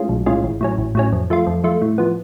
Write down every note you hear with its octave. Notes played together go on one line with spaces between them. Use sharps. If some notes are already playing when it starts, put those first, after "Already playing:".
Already playing: A2 G#3 C#4 F4
B1
A2 G#3 C#4 F4
A1
A2 F#3 C#4
A1
A2 F#3 C#4
F2
F3 A3 F4
F2
F3 A3 F4
A2
F3 B3